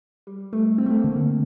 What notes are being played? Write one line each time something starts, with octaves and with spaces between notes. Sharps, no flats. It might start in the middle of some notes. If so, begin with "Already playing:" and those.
G3
A3
C4
A3
A#3
D3
D3